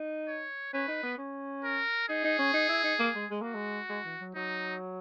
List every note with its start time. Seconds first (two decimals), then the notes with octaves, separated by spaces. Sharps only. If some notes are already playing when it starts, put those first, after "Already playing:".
Already playing: D#4
0.28 C#5
0.73 C#4 B4
0.88 D#4
1.03 B3
1.18 C#4
1.64 A#4
2.09 D#4 G#4
2.24 D#4
2.38 C#4
2.53 D#4
2.69 E4
2.84 D#4
2.99 A#3
3.15 G#3
3.30 G#3
3.41 A#3 F#4
3.54 G#3
3.89 G#3
4.05 E3
4.21 F#3
4.35 F#3 D#4